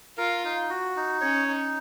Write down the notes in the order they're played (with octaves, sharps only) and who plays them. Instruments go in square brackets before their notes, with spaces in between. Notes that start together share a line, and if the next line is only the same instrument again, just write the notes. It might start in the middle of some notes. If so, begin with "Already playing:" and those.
[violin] F4 [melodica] A#4
[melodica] D#4
F#4
D#4
[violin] C#4 [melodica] C#5
[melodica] D#4